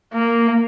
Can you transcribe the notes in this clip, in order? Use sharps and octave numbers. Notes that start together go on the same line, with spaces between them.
A#3